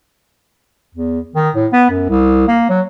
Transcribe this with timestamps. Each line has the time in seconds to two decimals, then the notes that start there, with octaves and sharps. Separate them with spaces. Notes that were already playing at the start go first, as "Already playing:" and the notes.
0.95 E2
1.35 D#3
1.55 A2
1.72 B3
1.90 F#2
2.09 C2
2.48 A#3
2.69 F#3